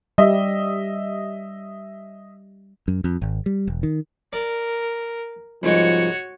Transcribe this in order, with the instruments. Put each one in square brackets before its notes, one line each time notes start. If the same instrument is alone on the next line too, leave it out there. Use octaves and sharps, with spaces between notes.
[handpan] G3 [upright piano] D#5 E5
[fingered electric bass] F#2
F2
G#1
G3
E1
D#3
[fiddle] A#4 [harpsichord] D5
[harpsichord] C2 G#2 G#3 [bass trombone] F3 [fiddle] F#4 C#5